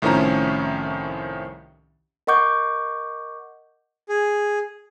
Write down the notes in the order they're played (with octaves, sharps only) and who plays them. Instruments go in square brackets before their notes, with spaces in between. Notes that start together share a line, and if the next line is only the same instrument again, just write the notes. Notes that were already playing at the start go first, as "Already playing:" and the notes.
[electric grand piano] C2 A2 D#3 F3 C#4 A#5
[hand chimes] A#4 D#5 F#5 C#6 D6 G6
[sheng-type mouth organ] G#4